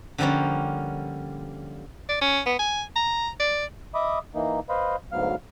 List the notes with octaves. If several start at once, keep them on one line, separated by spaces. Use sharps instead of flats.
D3 F3 G3 A#3 C#4
D5
C#4
B3
G#5
A#5
D5
D#5 E5 B5 D6 D#6
E3 A#3 D#4
B4 C5 D#5 F5 B5
D2 G#2 F#3 B3 F5 F6